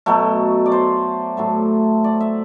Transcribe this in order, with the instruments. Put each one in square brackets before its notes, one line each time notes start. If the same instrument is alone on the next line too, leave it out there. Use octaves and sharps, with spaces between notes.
[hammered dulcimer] B2 F#3 A3
D5
C5
A2 F#3 A3
D5
E5